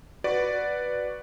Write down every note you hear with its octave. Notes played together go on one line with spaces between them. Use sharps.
F#4 B4 D5